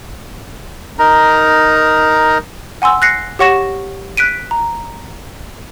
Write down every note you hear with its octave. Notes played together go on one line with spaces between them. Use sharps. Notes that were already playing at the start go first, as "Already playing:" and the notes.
D#4 A#4 A#5
F#5 G#5 C6 E6
F#6 A#6 C7 C#7
G4 C#5 F#5 C#6 A#6 E7
F#6 B6 D7 D#7
A#5